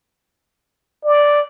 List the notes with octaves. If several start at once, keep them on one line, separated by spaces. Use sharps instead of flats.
D5